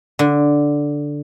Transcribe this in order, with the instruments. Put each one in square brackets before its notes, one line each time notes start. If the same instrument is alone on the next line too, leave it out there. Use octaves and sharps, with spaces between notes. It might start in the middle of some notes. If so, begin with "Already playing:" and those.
[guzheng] D3